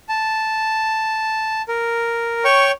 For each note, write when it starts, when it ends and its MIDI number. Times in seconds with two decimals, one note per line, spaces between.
0.09 1.62 81
1.68 2.44 70
2.44 2.71 73
2.44 2.71 79
2.44 2.71 85